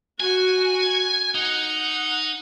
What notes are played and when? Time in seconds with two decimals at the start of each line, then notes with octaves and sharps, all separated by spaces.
0.20 F#4 G#5
1.35 D#4 F#5